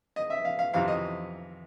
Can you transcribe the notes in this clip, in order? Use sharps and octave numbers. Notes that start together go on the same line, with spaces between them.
D#5
E5
F5
F5
F2 C3 E3 F5
D#5